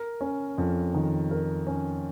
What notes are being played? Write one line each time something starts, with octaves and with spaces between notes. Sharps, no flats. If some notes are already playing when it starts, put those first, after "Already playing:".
Already playing: A#4
C#4
F2
D#3
A#4
C#4